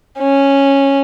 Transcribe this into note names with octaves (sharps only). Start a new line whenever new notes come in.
C#4